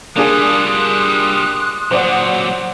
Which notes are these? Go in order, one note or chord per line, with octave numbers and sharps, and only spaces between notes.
G3 A#3 D4 F4 G#4 C6 D#6 F#6
A#2 F#3 C5 D5 F#5